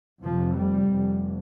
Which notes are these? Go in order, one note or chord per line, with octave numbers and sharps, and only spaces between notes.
F1 F2 C3 F3
G3
F1 F2 C3